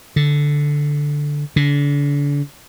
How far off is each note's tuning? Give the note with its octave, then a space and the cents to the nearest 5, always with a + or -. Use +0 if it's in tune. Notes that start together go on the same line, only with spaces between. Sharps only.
D3 -5
D3 -35